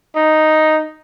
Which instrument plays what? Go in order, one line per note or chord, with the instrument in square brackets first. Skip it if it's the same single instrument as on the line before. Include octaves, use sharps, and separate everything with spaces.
[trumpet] D#4